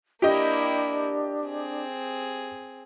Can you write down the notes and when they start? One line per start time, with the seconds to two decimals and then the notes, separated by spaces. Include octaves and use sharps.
0.22 A#3 D4 E4 G4 D#5
1.44 C4 G#4